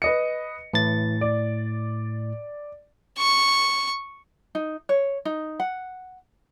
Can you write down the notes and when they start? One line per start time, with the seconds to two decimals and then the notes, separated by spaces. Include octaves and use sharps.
0.02 B4 D#5 C#7
0.74 A2 E3 A6
1.21 D5
3.18 C#6
4.55 D#4
4.89 C#5
5.25 D#4
5.60 F#5